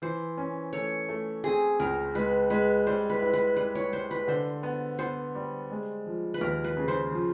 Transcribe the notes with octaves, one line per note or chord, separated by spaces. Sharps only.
E3 C5
C#4
A3 C#5
A3
C4 G#4
C#2 A#4
G#3 B4
G#3 B4
G3 C5
B4
E4
B4
G3 B4
C#5
G3 C5
B4
D3 C5
B3
B3 C5
G3
G#3
F3
B4
D#2 A#4
B4
C#3
C5
F3